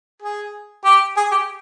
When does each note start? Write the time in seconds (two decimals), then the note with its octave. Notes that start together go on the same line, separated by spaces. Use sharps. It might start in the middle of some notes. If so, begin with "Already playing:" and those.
0.22 G#4
0.85 G4
1.17 G#4
1.31 G4